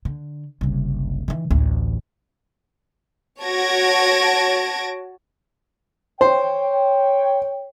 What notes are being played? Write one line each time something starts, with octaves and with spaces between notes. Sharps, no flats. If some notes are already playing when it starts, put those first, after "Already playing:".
D3
F#1 C2
D#3 E3
A1 D2
F#4 C#5 A5 G#6 A#6 D7
C5 C#5 G5